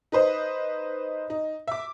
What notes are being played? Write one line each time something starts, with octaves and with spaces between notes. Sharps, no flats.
D#4 B4 C5 D#5
D#4
E5 D6